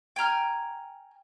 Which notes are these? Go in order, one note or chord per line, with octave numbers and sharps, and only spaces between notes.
G5 G#5 A#5 F6